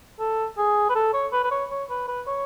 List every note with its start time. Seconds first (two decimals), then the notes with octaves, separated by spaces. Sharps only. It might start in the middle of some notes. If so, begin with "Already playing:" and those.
0.19 A4
0.58 G#4
0.90 B4
0.95 A4
1.14 C#5
1.33 B4
1.43 B4
1.51 C#5
1.71 C#5
1.90 B4
2.08 B4
2.27 C#5